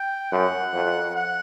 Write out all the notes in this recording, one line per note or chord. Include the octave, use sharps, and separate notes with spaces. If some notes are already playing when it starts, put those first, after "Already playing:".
Already playing: G5
F#2 F#5
F2
F#5